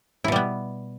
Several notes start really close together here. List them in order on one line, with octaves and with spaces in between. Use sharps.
E4 B2 G3 B3